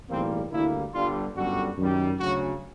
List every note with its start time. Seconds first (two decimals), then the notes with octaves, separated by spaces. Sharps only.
0.09 B1 A2 E3 G3 A#3 C4
0.52 D2 D3 G3 A#3 E4
0.93 G1 G2 D3 G3 F4
1.36 G1 F#2 D3 G3 F#4
1.78 F#2 D#3 G3
2.19 D2 C#3 F#3 F#4